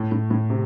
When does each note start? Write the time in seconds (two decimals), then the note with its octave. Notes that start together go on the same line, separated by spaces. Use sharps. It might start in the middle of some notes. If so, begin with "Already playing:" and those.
Already playing: A2
0.12 A2
0.31 A2
0.50 C3